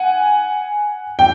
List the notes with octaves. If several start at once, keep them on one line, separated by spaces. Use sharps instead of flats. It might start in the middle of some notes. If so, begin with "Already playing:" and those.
Already playing: F#5 G#5
G5